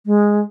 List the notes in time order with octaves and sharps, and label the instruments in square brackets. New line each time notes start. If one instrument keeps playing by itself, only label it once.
[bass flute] G#3